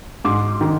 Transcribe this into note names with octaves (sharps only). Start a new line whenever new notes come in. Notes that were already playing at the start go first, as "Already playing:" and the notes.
G#2 C6 D6
D#3